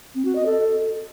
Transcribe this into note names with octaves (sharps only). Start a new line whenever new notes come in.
C4
F#4
D#5
A4